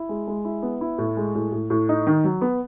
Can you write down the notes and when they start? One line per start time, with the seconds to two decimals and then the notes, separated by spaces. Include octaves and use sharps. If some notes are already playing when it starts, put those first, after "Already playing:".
Already playing: E4
0.09 G#3
0.27 G#3
0.45 E4
0.63 B3
0.81 E4
0.98 A2
1.17 G#3
1.35 A2
1.52 A2
1.70 A2
1.89 D#4
2.07 D#3
2.24 F#3
2.41 B3